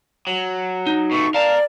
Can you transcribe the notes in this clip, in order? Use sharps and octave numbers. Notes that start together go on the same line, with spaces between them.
F#3
D#4
B2 A3 C#6
A#4 D5 F5 A5